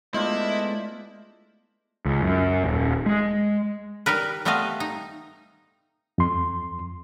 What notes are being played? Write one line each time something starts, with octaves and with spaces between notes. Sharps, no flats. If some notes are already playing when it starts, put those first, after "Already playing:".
G#3 A3 B3 D4 E4 F4 C5 D#5
C#2
F#2
D#1
G#3
G3 D#4 A#4 B4
G3 A3 B3 C4 D#5 F5
D#4
F2 C6